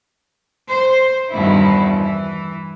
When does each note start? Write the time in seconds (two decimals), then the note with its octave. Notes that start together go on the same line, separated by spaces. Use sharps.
0.69 C5
1.32 E2 G2 B2 D#3 C4 E4
1.97 E3